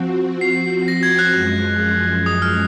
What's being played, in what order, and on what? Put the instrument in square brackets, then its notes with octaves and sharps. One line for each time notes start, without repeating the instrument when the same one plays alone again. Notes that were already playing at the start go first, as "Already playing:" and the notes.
Already playing: [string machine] F3 C4 F#4
[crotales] C7
A#6
G#6
F#6
[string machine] F#2 F3 G#3
[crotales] D#6
F6